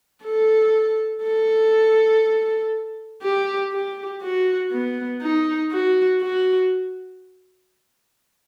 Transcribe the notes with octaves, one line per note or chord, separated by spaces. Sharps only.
A4
A4
G4
G4
F#4
B3
D#4
F#4
F#4